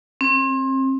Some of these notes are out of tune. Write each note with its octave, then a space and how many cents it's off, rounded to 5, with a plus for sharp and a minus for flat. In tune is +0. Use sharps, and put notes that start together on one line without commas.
C4 +30